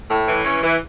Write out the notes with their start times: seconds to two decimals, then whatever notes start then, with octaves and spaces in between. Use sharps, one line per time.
0.10 A2
0.27 E3
0.44 C#4
0.63 E3